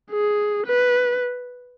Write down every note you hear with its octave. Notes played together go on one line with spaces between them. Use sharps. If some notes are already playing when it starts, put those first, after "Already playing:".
G#4
B4